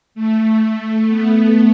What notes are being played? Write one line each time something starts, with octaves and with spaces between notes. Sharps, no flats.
A3
B3